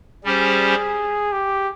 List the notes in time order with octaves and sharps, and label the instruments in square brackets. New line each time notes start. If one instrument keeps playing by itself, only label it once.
[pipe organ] G3 C#4 G4 C5 [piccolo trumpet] G#4
[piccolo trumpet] G4